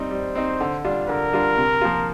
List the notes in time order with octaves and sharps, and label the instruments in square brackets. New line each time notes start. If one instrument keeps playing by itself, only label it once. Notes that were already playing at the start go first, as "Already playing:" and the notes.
Already playing: [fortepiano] G3 C4 D#4
[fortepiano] G3 [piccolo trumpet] C5
[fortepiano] C4 D#4
D3
G3 D4 F4
[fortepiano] D3 [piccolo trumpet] A#4
[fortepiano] G3 D4 F4
C3
F3 A#3 F4